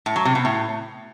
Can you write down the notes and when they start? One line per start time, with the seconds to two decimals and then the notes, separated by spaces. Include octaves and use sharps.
0.06 A2
0.16 F#3
0.25 C3
0.35 B2
0.45 A2